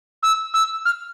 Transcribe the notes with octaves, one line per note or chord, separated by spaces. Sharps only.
E6
E6
F6